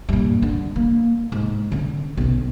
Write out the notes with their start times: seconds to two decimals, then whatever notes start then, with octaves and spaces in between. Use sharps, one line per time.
0.09 G2 A#2
0.42 D3
0.76 A#3
1.32 G#2
1.72 D3 C#4
2.17 B1 C#4